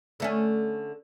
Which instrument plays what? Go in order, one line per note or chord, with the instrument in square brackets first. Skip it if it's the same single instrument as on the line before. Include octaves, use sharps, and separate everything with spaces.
[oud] D3 A3 C#4